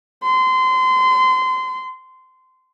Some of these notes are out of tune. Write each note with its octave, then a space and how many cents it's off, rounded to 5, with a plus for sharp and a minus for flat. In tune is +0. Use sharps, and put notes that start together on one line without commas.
C6 -25